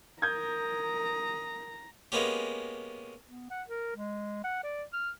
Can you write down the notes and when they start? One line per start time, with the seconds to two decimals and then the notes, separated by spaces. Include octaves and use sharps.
0.22 A#4 A#5 D#6 G6 G#6
2.12 G#3 A#3 B3 C#4 G4
3.27 B3
3.51 F#5
3.68 A#4
3.96 G#3
4.44 F#5
4.64 D5
4.93 F6